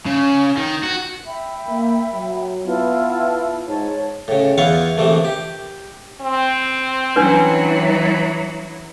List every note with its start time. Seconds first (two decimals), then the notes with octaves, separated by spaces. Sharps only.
0.06 C#3
0.57 D#3
0.83 F#4
1.26 E5 G5 B5
1.68 A#3
2.14 F#3
2.66 B3 E4 F4 A5
3.67 G#2 C#5 A5
4.28 A2 C#3
4.58 E2 B3 E4 F4 F5 C#6
4.98 A#1 C3 E3 A3
5.25 G4
6.21 C4
7.16 E3 F#3 C#4 D4 B4